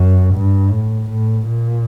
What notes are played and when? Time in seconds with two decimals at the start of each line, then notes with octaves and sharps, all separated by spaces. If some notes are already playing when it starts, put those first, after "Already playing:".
Already playing: F#2
0.34 G2
0.71 A2
1.10 A2
1.47 A#2